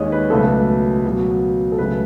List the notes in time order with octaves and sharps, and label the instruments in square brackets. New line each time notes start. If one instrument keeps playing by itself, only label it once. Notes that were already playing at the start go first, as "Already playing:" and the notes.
Already playing: [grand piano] D#2 D#3 G#3 C#5 D#5
B4
C#2 B2 F#3 A3 A4
B4
A4
C#2 B2 F#3
A4
C#2 C#3 F#3 A3 B4